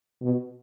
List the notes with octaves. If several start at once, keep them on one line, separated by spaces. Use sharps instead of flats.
B2